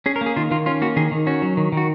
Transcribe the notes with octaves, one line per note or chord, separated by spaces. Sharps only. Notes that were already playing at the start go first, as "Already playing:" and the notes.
C#4 G#4
A#4
A#3
G#4
D#3 F4
D#3 F4
C#4 F4
A#3 F#4
D#3 G#4
D#3
C#4 F#4
F#3
D#3
D#3 F#4